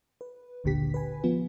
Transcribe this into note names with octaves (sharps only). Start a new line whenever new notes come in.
B4
G1 D2 A#2 D3 G4 B6
B4 G#5
F3 B3 F4